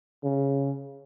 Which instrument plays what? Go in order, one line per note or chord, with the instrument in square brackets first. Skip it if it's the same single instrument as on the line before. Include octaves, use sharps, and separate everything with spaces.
[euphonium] C#3